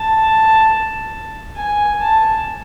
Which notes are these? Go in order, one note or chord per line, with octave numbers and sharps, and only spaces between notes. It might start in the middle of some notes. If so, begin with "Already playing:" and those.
Already playing: A5
G#5
A5